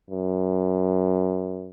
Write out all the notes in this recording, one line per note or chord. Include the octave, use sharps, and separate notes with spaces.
F#2